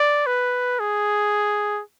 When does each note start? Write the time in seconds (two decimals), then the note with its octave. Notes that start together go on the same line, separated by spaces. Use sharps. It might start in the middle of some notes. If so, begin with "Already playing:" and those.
Already playing: D5
0.27 B4
0.80 G#4